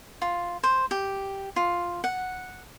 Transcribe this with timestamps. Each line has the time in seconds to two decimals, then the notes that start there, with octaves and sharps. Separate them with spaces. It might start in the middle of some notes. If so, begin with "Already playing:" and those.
0.22 F4
0.63 C5
0.91 G4
1.56 F4
2.04 F#5